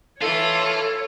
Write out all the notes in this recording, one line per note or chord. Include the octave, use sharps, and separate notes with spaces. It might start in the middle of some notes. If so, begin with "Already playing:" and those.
E3 A3 F4 A4 C#5 F#6